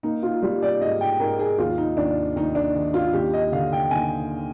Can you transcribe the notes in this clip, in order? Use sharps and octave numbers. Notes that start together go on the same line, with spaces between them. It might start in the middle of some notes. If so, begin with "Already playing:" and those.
A#3 D#4
F4
G3 F4
D5
G#2 D#5
G5
G#2 A#4
G#4
D#2 F4
D#4
D#2 D4
D#2 D#4
D4
D#3 D#4
F4
D#2 G4
D#5
D3 F5
G5
D#2 G#5